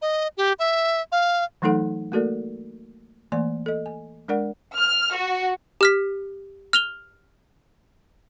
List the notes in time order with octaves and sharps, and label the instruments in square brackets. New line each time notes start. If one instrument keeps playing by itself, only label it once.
[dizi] D#5
G4
E5
F5
[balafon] E3 F#3 A3 D#4 A4 F#5
A3 A#3 F#4 A4 A#4 D5
E3 A3 A#3 D5 G#5
A4 D#5
G#5
G#3 D4 A#4 D5 F#5
[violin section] F6
F#4
[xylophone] G4 F6 B6
F6 F7 G7